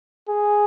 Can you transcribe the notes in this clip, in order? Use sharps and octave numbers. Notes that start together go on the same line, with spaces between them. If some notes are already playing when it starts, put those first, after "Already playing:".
G#4